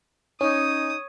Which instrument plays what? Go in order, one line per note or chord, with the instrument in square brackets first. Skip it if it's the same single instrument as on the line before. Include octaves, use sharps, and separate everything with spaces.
[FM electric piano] C#4 [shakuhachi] D#4 [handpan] C#5 [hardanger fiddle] D#6